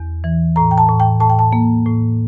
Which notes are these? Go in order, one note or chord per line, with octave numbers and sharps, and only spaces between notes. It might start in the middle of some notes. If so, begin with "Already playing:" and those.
Already playing: E2
E3
A2 A#5
G5
A5
A2
G5
A2 A5
G5
A5
A#3
A2